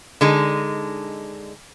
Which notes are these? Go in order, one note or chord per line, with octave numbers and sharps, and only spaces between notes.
D3 G#3 D#4